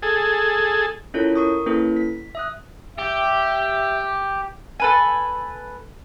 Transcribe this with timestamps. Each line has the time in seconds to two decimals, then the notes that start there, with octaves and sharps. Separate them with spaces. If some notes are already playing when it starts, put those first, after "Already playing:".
0.02 G#4 A4
1.14 C#4 E4 F4 A4 A#4 C#5
1.35 A#4 C#6 D#6
1.66 A#3 C#4 E4 A4 B4
1.96 B6
2.35 E5 D#6 F#6
2.98 G4 E5
4.80 A4 B4 G#5